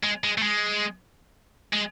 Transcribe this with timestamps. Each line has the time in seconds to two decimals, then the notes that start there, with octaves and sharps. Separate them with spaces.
0.04 G#3
0.24 G#3
0.38 A3
0.42 G#3
1.73 G#3